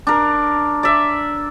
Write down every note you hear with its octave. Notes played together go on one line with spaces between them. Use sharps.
D4 A#4
D5 E5